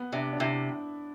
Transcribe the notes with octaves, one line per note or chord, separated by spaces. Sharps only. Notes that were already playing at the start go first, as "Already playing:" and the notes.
Already playing: B3
C3 D4
D4
C3 E4